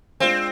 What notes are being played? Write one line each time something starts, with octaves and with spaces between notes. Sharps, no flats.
G#3 C4 D4 F4 C5 F5